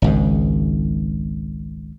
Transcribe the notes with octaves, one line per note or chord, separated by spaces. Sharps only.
G#1 C#2 G#2